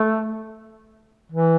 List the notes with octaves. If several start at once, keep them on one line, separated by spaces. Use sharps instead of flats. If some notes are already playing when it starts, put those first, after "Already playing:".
Already playing: A3
E3